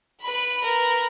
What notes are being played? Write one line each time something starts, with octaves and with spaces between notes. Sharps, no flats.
B4 B5
A#4 B4